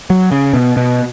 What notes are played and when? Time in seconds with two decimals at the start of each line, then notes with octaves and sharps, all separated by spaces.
0.10 F#3
0.32 C#3
0.53 B2
0.77 B2